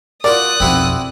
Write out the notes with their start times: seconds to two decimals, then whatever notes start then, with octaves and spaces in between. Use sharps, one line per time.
0.24 F4 F#4 A#4 D5 D#6 F#6
0.60 B1 F2 C4 E4 F#4